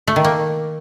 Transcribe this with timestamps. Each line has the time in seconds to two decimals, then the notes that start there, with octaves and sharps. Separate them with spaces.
0.08 A3
0.16 D#3
0.25 A#3